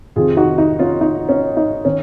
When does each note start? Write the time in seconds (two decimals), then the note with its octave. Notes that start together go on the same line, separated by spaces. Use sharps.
0.16 F2 C3 D#3 F4 G#4
0.37 D#4 F#4
0.58 D#4
0.79 C#4 F4
1.01 D#4
1.29 C#4
1.57 D#4
1.85 D#3 C#4